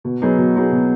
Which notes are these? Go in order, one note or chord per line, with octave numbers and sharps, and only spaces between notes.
B2
F#3 B3 D#4 G#4
B2
F#3 B3 D#4 G#4
B2